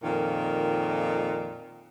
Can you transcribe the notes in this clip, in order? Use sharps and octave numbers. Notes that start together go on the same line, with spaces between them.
F2 A#2 D#3